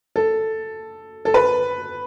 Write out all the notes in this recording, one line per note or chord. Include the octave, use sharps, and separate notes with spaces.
A4
A4
B4